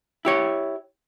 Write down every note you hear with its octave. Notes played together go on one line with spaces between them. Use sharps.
E4 G4 C#5